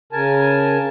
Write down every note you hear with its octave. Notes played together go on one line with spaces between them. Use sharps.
C#3 A#4 G#5 A5